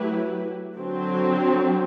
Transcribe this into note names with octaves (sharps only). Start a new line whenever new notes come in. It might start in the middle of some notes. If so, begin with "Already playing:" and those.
Already playing: F#3 A3 E4 G4 B4
D3 F#3 C4